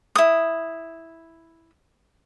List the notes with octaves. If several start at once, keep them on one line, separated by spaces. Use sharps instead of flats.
E4 D#6